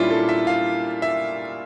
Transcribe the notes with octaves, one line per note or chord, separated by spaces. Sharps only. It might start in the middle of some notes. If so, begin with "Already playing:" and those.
Already playing: A#2 G3 A#3 C#4 D4 E4 F4
A4
E5
F5
E5